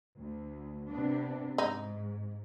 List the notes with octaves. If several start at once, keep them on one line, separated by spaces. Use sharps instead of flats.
D2
C3 B3 D4
G#2 D#4